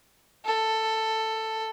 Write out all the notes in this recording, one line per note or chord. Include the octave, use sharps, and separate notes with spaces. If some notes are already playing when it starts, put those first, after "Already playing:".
A4